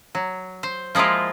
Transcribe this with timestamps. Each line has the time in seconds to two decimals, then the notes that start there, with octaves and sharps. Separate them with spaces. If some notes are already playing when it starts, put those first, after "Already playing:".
0.15 F#3
0.63 C5
0.95 F3 G#3 A#3 E4 F4